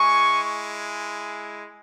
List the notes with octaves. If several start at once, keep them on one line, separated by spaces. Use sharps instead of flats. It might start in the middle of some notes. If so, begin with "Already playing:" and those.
Already playing: G#3 E4 G#5 C#6